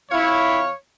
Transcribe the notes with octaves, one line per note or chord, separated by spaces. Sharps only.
F2 E4 C#5 F5